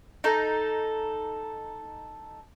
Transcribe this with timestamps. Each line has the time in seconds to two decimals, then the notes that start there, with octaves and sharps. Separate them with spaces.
0.24 D#4 A4